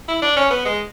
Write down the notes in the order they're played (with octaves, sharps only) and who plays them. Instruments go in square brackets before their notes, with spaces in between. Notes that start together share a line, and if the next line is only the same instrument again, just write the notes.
[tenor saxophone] E4
D4
C#4
B3
G#3